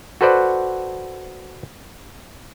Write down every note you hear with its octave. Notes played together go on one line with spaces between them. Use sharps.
F#4 A4 B4 C5 D5 F#5